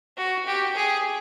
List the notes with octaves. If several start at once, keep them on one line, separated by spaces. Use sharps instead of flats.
F#4
G4
G#4